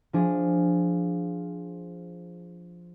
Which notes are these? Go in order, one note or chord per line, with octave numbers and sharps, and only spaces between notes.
F3 D4 G#4